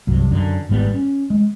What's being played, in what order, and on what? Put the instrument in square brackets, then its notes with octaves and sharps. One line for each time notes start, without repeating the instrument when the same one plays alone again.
[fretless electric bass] C2 G2 F#3
F#2 D3
G#1 G#2 G3 B3
C#4
G#3